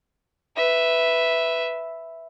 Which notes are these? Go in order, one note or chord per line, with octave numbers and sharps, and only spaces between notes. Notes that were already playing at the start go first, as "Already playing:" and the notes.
B4 E5